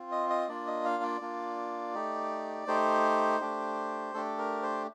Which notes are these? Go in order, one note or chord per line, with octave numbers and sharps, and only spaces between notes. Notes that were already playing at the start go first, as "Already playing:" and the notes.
Already playing: C4 F4
D#5
D#5
A#3 D4 F4 D5
D#5
F5
D5
A#3 D4 F4
A3 D#4 G4
A3 D#4 G4 C5
A3 D4 G4
A3 D4 G4 A4
A#4
C5